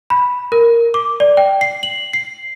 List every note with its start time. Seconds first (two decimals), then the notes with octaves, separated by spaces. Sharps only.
0.10 B5
0.52 A#4
0.94 D6
1.20 D5
1.37 G5
1.61 C7
1.83 F#7
2.13 C7